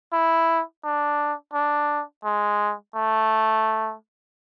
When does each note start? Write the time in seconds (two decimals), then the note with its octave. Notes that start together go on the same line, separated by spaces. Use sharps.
0.13 E4
0.84 D4
1.53 D4
2.24 G#3
2.95 A3